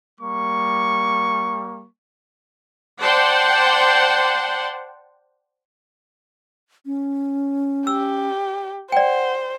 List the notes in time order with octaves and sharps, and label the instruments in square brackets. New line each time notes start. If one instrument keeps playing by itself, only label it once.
[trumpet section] G3 A#3 C#6
[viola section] C5 D5 F#5 G5 A5 C6
[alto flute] C#4
[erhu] G4 [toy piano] E6
[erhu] C5 [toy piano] D5 G5 [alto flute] F#5